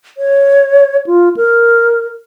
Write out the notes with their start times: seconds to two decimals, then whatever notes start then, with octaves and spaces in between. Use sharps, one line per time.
0.18 C#5
1.07 F4
1.37 A#4